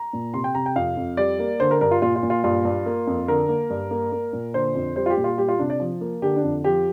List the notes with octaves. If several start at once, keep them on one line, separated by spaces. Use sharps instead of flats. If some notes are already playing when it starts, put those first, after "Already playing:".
Already playing: A#5
A#2
C3 C6
G5
C3 A#5
G5
F2 F5
F2
G3 D5
A#3
D3 C5
A#4
G2 A#4
F4
A#2 F4
F4
A#2
F4
G2 F4
G2
A#3
F2
D3 A#4
A#3
G2
A#3
A#3
A#2
D3 C5
F2
G3 C5
F4
G4
A#2
F4
G3 G4
F4
C3 D4
D5
F3
A#3
D3 G4
D4
F2
F3 G4